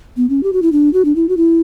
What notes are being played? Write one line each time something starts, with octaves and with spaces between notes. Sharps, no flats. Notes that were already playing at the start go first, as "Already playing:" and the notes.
B3
C#4
G4
F#4
E4
D4
F#4
D4
E4
F#4
E4